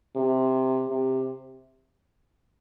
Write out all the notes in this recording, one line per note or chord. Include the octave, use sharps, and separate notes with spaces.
C3
C3